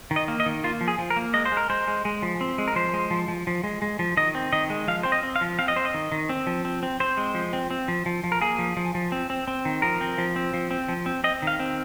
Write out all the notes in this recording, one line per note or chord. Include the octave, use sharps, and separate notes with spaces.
D#3
D#5
A#3
D#5
D#3
A#3 F4
F3
G#4
F3
A#4
A#3
G#3 D#5
C5
G#3
A#4
G#3 C5
G#3
G#3
F3
C4
G#3
A#4
F3 C5
G#3
F3
F3
F3
G#3
G#3
F3
D#3 D#5
C4
D#3 D#5
G#3
F3 F5
C4 C5
D#5
C4
F5
F3
C4 F5
D#5
C4 C5
D#5
D#3
D#3
C4
F3
C4
C4
C4 C5
G#3
F3
C4
C4
F3
F3
F3
A#4
A#3 G#4
F3
F3
F3
C4
C4
C4
D#3
F3 A#4
C4
F3
C4
F3
C4
F3
C4
C4 D#5
D#3 F5
C4